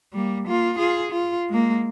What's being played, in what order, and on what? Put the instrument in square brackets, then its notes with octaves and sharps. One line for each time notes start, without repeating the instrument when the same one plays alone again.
[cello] G3 A#3
A#3 F4
F4 G#4
F4
G#3 A#3